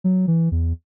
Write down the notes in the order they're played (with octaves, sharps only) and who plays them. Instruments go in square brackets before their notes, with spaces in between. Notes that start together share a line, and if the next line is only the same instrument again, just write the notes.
[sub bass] F#3
E3
E2